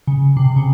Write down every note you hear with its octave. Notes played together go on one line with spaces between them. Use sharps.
C#3
C3
C#3